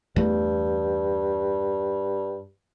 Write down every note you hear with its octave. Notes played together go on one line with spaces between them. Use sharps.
E2 G2 A3